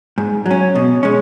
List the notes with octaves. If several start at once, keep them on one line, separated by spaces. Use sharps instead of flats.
G#2
F#3 C#4
B2
G#3 C#4